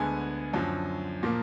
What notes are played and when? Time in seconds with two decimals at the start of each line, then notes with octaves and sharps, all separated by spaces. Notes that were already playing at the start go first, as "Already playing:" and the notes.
Already playing: D2 D3 G#3 B3 G#5
0.53 F#2 D3 F3
1.23 A#2 F3 A#3